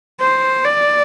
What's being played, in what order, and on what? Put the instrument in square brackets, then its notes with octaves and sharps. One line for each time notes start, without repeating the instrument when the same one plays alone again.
[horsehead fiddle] C5
D5